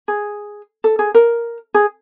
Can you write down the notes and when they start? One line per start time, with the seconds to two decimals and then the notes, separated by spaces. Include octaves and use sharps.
0.08 G#4
0.84 A4
0.99 G#4
1.14 A#4
1.74 G#4